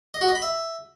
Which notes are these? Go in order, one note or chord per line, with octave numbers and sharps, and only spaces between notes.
D#5
F#4
D#5
B5
E5